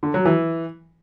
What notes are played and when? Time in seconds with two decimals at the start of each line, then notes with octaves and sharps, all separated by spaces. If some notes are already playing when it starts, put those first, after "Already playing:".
0.03 D3
0.14 F#3
0.25 E3